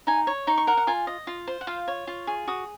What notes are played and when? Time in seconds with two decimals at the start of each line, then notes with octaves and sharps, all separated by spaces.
0.07 D#4 G#5
0.27 C#5
0.47 D#4 C#6
0.58 C#6
0.67 A#4 F#5
0.77 F#5
0.87 F4 G#5
1.07 D#5
1.27 F4
1.47 C5
1.61 F#5
1.67 F4 F5
1.88 C#5
2.07 F4
2.27 G#4
2.47 F#4 D#6